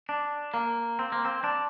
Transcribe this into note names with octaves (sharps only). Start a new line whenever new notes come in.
D4
A#3
C4
A#3
C4
D4